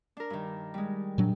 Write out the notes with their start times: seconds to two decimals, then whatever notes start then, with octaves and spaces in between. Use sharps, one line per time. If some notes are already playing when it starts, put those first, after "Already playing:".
0.17 D4 A#4
0.30 G2 D#3
0.74 G3 G#3
1.18 A#2 F#3 D4